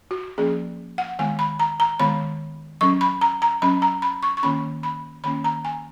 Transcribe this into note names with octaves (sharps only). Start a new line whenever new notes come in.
F#4
F3 A#3 C#4 G#4
F#5
D#3 G#3 B3 G#5
B5
A#5
A#5
D#3 G#3 B3 B5
F#3 C#4 C#6
B5
A#5
A#5
F#3 C#4 B5
A#5
B5
C#6
C#6
D#3 A#3 C#4 B5
B5
D#3 A#3 C#4 B5
A#5
G#5